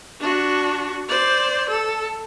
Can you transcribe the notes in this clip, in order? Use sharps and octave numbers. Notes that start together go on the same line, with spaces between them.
D4 F#4
C5 D5
A4